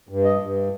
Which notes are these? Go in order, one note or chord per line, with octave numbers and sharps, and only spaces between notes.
G2
D#5
G2